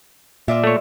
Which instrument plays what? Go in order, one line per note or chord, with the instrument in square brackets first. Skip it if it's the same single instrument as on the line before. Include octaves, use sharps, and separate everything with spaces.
[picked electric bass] A#2 [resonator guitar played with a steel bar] F4 D5 E5
[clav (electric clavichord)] A3 C#5